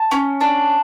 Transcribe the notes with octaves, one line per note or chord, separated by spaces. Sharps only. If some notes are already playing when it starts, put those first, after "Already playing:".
Already playing: A5
C#4
D4